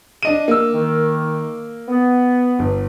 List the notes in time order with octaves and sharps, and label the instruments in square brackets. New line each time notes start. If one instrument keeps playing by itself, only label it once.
[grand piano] D4 D#5 D#7
A#3 E6
[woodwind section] D#3
B3
[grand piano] G1